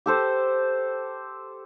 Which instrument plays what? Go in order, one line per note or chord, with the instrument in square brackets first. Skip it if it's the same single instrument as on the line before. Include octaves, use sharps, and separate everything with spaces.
[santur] G4 A4 C5